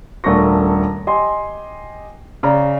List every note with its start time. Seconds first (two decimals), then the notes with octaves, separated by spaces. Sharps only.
0.24 D#1 A3 D4 A#4 C#6 A#6
1.07 G4 D#5 G#5 C6
2.43 C#3 D5 A#5